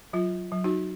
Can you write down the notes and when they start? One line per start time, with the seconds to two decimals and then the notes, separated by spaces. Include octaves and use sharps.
0.13 F#3 F4
0.52 F#3
0.64 D#4 F#4